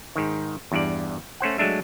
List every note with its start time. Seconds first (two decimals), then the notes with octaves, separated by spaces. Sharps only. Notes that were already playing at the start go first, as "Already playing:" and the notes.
0.16 G#2 D#3
0.72 E2 G2 D5
1.40 A3 C#4 C5 F#5
1.58 F#3 G#3 A3 D4 E5